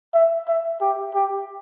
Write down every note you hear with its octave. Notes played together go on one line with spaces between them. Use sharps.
E5
E5
G4
G4